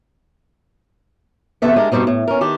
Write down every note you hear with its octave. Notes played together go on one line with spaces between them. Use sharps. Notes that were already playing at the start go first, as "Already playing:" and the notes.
E2 C3 B3 A4 E5 F#5
G#3 D4 G4 A#4
G2 B2 G3 C4 D#4
A2
C#4 A#4
D#3 D4 G4